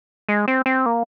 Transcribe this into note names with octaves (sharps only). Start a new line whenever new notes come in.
G#3
C4
C4
A#3